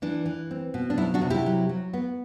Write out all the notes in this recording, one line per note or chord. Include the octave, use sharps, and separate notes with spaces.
E3 D4
E3
C4
B2
D4
F#3 E4
D4 F#4
C3
E4 G4
F#3
F#3
B3